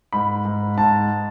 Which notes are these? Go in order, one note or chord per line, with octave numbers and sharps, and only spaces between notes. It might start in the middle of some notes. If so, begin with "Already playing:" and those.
G#2 B5
G#2
G#2 A5